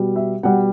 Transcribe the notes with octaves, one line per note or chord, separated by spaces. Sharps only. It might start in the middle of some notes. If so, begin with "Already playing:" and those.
Already playing: B2 G3
E5
B2 G3 F#5